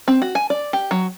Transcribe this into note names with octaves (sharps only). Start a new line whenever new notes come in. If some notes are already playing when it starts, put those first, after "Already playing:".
C4
F#4
G#5
D5
G4
F#3